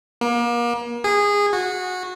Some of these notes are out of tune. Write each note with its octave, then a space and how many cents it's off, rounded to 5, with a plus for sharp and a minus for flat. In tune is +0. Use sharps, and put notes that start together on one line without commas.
A#3 +35
G#4 -20
F#4 -20